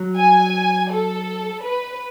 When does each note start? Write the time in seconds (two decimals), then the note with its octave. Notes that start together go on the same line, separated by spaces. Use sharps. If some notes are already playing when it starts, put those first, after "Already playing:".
Already playing: F#3
0.18 G#5
0.91 A4
1.64 B4